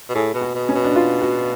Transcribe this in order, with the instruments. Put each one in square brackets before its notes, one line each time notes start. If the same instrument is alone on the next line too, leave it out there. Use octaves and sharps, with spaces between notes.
[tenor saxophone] B2
[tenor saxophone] A2 [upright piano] G#4
[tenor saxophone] B2
[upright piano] F#4
[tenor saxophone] B2
[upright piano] C#4
[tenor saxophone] B2
[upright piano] D4
F4
F#4